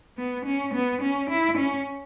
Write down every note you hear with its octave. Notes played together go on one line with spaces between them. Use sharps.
B3
C#4
B3
C#4
E4
C#4